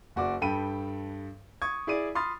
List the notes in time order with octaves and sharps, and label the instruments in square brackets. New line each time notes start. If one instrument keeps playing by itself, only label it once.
[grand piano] F#1 F#4 D5 D6
G2 A4 G5 B5 D#7
C#6 D#6 G#6
E4 G#4 D5 D#7
B5 C6 D#6 F6 A6